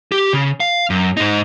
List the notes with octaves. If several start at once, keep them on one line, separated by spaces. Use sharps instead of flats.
G4
C#3
F5
F#2
G#2 D#4